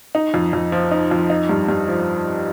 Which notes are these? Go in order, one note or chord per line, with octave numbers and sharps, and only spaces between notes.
D#4
F2
F2
F3
D#4
F2
D#4
G2
G2
F3